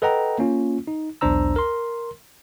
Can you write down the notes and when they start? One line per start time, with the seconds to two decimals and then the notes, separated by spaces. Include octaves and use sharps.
0.02 A4 B4 D#5 F#5 G5 A#5
0.39 A#3 C#4 F4
0.87 D#4
1.21 B1 E2 D4 C5 A#5 E6
1.56 A#4 C6